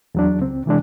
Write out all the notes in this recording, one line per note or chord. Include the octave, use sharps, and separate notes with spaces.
E2 F#3 D4
C#2 C4
C3 E3 G#3 D4